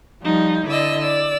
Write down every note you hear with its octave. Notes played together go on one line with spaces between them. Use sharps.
F3 G3 D#4
D3 E4 D5 D#5 E6
D5 E6